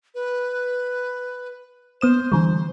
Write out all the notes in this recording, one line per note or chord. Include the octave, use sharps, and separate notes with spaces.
B4
B3 C5 D#6 E7
D3 E3 G3